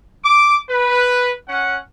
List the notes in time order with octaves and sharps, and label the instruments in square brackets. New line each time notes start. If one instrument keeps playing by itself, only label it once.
[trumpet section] D6
B4
C#4 F#5